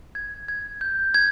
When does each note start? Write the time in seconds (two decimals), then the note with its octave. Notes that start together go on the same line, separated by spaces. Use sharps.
0.15 G#6
0.48 G#6
0.81 G6
1.14 G#6